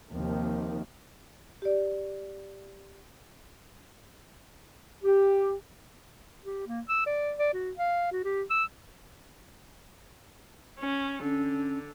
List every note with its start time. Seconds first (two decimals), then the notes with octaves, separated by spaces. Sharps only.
0.11 D#2 C3 D#3 F3
1.62 G4 D5
5.04 G4
6.45 G4
6.67 A#3
6.89 E6
7.06 D5
7.39 D5
7.54 F#4
7.78 F5
8.12 F#4
8.24 G4
8.50 E6
10.79 C#4
11.23 D3 C#4